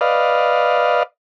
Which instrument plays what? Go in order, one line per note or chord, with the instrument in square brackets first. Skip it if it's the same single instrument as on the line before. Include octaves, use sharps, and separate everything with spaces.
[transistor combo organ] B4 D5 D#5 F5